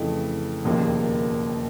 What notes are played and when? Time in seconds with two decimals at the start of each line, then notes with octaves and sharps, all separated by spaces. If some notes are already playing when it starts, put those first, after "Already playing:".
Already playing: F2 C#3 E3 A3
0.65 E1 D#2 C#3 F3 A#3